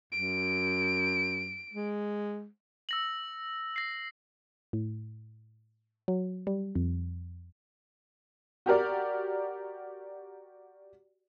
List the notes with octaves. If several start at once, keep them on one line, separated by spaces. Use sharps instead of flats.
F#2 D7
G#3
E6 A#6 F#7
A#6 C7
A2
F#3
G3
F2
F#4 G4 A#4 D5